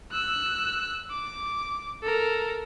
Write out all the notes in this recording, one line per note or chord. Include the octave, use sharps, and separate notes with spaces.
E6 F#6
D6
A4 A#4